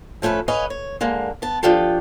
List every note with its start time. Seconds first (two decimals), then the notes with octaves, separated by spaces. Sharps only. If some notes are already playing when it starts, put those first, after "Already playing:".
0.22 F3 A3 C#4 A4 B4
0.48 B4 C#5 D#5 F5 G#5
0.70 C#5
1.01 D3 G#3 A#3
1.42 B3 A5
1.63 F3 D4 F4 G4 A4